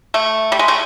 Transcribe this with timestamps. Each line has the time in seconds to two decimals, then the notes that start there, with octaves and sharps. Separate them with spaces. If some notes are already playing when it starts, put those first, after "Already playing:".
0.14 A3
0.52 G3
0.59 G#3
0.68 A3